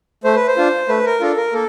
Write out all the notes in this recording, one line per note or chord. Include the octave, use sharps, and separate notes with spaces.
A3 C5
B4
C5
D4 F4
A3 B4
A#4
D4 F4 A4
A#4
A#3 A4